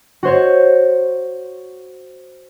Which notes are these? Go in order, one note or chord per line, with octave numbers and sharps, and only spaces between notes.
F#4 C5 C#5